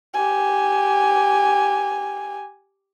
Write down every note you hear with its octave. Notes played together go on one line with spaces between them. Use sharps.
G4 G#5